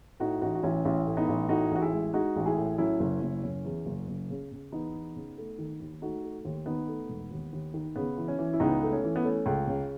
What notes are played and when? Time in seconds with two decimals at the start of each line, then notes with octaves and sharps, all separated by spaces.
0.20 A2 D#4 F#4
0.41 A1 D#4 F#4
0.55 F#4
0.63 A1 C#4 E4
0.85 A1 C#4 E4
1.07 A2
1.17 B3 D#4
1.28 A1
1.49 A2 D#4 F#4
1.71 A1 F#4
1.82 E4 G#4
1.92 G#3
2.14 G#3 D#4 F#4
2.36 A1
2.46 E4 G#4
2.57 A2
2.78 F#3 C#4 E4
3.00 F#1
3.21 F#1
3.43 F#1 C#4
3.65 E2
3.86 F#1
4.08 F#1
4.30 C#3
4.52 C#3
4.72 E2 B3 D#4
4.94 E2
5.16 C#3
5.38 A3
5.58 D#3
5.80 D#2
6.02 A3 D#4 F#4
6.24 A3
6.45 D#2
6.66 D#3 B3 D#4
6.88 A3
7.09 E1
7.31 D#2
7.53 D#2
7.74 D#3
7.96 C#3 B3
8.18 E3
8.28 C#4
8.39 E3
8.53 E4
8.60 C#2 B3 D#4
8.82 A3
8.93 C#4
9.04 E3
9.16 B3
9.24 A3 C#4
9.46 C#2
9.67 C#3